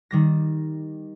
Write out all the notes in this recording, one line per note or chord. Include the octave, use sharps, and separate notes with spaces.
D#3 G3 A#6